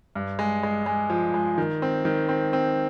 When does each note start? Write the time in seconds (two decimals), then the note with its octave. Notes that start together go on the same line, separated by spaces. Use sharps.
0.15 G2
0.39 G#3
0.63 G#3
0.86 G#3
1.10 F3
1.34 G#3
1.58 D#3
1.82 C4
2.05 D#3
2.29 C4
2.53 C4